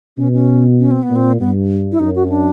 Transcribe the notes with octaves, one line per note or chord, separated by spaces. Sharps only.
B2 C#4
C#4
C#4
C4
B3
A#2
C4
G2 B3
E4
F#2 D#4
F#4
C#4
D4